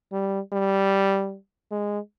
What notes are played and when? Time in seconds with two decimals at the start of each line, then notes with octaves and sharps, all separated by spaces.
0.12 G3
0.53 G3
1.71 G#3